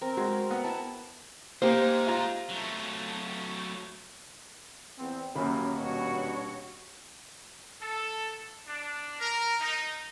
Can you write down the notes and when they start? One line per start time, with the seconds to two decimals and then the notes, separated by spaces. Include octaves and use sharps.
0.01 C4 A#4
0.17 G#3 F#4
0.51 B3 F#5
0.64 E4 A5
1.62 G#3 A#3 D#4 G4 C5
2.07 F4 A#5
2.49 F#3 A3
4.98 E2 B3 C4
5.35 D#1 F#2 A#3 B5
5.76 G2 B2 F#4 C#5
7.81 A4
8.67 D4
9.20 A#4
9.60 D#4